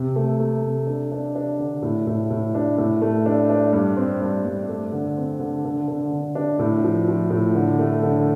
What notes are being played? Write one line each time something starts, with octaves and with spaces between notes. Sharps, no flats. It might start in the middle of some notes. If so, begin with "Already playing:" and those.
Already playing: C3
A3
A3
C3
D4
D4
D4
D3
A2
A2
A2
D4
A2
A3
D4
D4
G2
C4
G2
G2
A3
D3
C4
D3
D3
D3
D3
D4
A2
F3
F3
A2
D3
A3
D3